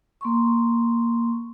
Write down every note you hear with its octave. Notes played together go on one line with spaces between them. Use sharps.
A#3 C6 C#6